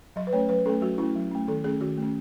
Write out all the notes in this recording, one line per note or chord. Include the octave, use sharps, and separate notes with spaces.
F#3 D#5
B4
A3 C#4 C#5
F#3 B4
A3 C#4 A4
F#3 F#4
A3 C#4 E4
F#3
A3 C#4
D#3 A4
A3 C#4 G#4
D#3 F#4
A3 C#4